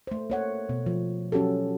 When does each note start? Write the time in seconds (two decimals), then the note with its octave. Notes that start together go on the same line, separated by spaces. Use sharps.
0.07 A3 C5
0.30 A#3 C#5 F#5
0.69 B2
0.86 F3
1.32 F#3 C#4 F#4 G4 A4